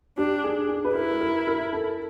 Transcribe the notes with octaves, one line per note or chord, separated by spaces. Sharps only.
D4 G4
G#4
G#4
B4
E4 A#4
A#4
A#4
A4